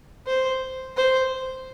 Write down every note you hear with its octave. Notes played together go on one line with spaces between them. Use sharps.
C5
C5